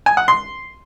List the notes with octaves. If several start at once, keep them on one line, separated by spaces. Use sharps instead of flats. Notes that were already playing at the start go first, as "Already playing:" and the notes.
G#5
F#5
C6